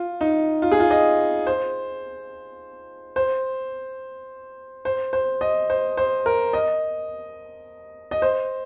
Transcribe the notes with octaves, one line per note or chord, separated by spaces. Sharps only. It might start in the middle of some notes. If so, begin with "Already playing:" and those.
Already playing: F4
D#4
F4
G#4
F4
D#5
C5
C5
C5
C5
D#5
C5
C5
A#4
D#5
D#5
C5